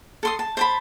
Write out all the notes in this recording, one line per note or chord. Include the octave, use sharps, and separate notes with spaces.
A4 C6 D#6
A5
C5 A5 B5